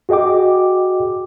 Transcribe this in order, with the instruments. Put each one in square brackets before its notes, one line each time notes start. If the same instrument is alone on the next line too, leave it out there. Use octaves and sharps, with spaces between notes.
[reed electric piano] F#4 G#4 D#5 G5 D6